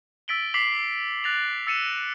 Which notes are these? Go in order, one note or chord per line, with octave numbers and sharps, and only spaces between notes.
E6 A6 B6 D7 F#7 G7
D6 B6 C7 F#7
F#6 A6 A#6 F7
E6 A6 C#7 D#7 E7